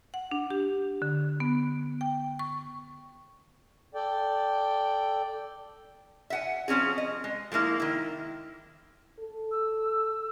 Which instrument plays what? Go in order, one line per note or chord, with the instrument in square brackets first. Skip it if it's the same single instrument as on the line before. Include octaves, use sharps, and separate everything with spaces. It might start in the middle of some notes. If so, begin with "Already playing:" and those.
[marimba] F#5
D4
G4
D3
B3
G5
C#6
[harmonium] A4 D5 G5
[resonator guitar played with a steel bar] E5 F#5 G#5
F3 C4 C#4 D#4 G#4
D#5
G#3
F3 G#3 A#3 E4
D#3 E4
[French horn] A4
[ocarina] E6